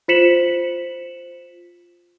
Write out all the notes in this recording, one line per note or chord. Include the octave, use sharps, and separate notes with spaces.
F4 C5 B6 C#7 E7 F#7